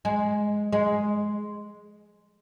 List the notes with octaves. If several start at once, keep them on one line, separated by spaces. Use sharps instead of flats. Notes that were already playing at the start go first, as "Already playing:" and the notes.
G#3
G#3